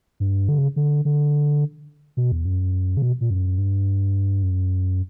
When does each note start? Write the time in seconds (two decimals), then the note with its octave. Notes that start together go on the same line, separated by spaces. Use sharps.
0.20 G2
0.49 D3
0.58 C#3
0.76 D3
1.05 D3
2.17 B2
2.32 E2
2.45 F#2
2.97 C#3
3.02 B2
3.21 A#2
3.30 F#2
3.58 G2
4.43 F#2